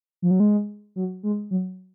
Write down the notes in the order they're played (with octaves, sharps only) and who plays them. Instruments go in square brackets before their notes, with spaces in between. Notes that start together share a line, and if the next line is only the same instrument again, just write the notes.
[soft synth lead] F3
F#3
G#3
F#3
G#3
F#3